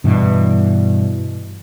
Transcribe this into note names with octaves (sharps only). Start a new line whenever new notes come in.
G2 B2 E3